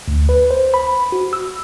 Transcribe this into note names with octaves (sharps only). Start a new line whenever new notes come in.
D2
B4
C5
B5
F#4
E6